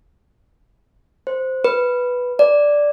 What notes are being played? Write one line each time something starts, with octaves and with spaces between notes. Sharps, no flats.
C5
B4
D5